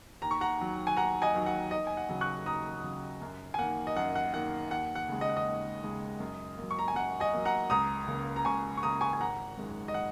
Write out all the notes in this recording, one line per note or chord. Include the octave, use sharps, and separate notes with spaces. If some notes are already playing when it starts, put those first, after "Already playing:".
D#2 A#5
C#6
F#5 A#5
D#3 F#3
G#5
D#2 F#5 A#5
D#5 G#5
D#3 F#3
F#5
D#2 D#5
G#5
F#5
C#3 F#3
C#6 F#6
D#2 A#5 D#6
C#3 F#3
F#2
G#5
D#3 A#3 F#5
D#5
F#2 F#5
F#5
D#3 A#3 F#5
D#2 F#5
F#5
C#3 G#3
D#5
F#5
D#5
D#2
C#3 G#3
F#2
F#3 A#3
C#6
A#5
G#5
F#2 F#5
D#5 G#5
F#3 A#3
F#5 A#5
C#2 A#5 D#6
C#3 A#3
A#5
C#2 G#5 C#6
C#6
C#3 A#3 A#5 D#6
G#5 C#6
G#5
G#1 F#5 A#5
F#2 D#3 G#3
D#5
F#5